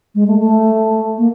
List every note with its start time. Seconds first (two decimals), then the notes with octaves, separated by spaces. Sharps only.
0.15 G#3
0.28 A3
0.39 A3
1.18 A#3